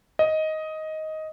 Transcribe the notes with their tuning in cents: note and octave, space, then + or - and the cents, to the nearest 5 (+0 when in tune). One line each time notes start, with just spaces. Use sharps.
D#5 +10